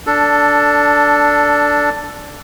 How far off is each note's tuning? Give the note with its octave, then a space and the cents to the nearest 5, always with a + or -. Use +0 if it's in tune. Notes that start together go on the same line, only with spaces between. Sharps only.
D4 -10 A4 +10